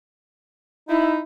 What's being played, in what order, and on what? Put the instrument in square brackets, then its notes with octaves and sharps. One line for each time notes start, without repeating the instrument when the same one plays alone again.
[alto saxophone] D#4 [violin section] E4